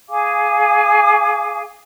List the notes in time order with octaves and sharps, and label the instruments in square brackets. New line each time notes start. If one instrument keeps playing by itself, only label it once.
[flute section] G#4 F5 G#5 D6